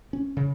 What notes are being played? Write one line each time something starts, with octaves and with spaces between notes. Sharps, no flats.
C#4
C#3